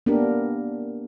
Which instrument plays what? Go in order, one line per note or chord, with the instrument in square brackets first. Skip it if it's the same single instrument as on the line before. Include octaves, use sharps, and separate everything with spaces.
[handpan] A#3 B3 D4 G4 A#4